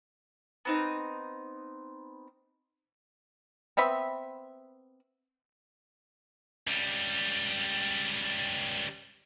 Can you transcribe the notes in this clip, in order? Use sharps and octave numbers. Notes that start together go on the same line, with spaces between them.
B3 C4 D#4
B3 C4 E5 B5
C#2 G3